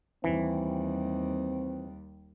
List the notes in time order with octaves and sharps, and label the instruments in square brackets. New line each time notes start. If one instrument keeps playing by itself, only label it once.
[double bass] D#2 G3 [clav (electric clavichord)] E3 [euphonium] C4